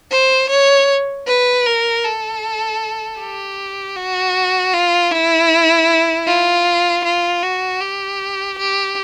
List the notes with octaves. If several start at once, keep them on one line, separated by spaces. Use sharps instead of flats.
C5
C#5
B4
A#4
A4
G4
F#4
F4
E4
F4
F4
F#4
G4
G4